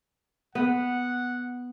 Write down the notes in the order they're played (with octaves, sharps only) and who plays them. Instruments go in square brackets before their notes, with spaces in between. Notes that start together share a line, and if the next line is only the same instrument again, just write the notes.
[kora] B3 [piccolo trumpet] F#5